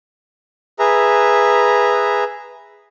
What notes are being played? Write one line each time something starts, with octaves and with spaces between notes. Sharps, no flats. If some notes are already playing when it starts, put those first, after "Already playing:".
G#4 B4 E5 A#5